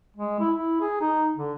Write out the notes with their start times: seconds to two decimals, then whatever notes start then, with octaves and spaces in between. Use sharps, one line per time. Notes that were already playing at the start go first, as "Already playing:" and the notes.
0.17 G#3
0.40 E4
0.56 E4
0.81 G#4
1.01 D#4
1.37 D3